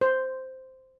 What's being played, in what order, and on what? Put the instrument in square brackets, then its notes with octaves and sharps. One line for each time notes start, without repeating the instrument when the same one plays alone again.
[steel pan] C5